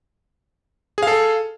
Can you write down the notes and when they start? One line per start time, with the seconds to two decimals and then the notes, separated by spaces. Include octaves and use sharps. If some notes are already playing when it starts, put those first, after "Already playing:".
0.98 G#4
1.03 F5
1.07 A4